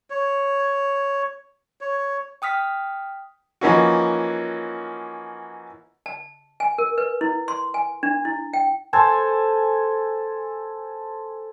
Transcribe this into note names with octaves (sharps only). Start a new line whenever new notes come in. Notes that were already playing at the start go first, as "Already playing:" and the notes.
C#5
C#5
G5 D#6 F6 B6
E3 F3 A#3 C#4 D#4 F#4
A5
G#5
A#4
B4
E4
C6
G#5
D4
E4
G5
A4 C5 G#5 A5